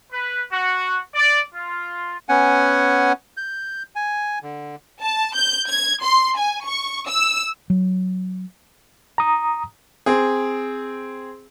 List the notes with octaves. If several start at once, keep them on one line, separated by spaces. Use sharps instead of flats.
B4
F#4
D5
F4
B3 C#4 F#5 G#5
G6
G#5
D3
A5
G6
G#6
C6
G#5
C#6
E6
F#3
A#5 D#6
C4 G#4